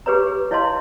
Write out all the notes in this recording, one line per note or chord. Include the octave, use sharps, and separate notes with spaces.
G4 G#4 B4 C#5 A#5
E4 C#5 D#5 F5 A5 C6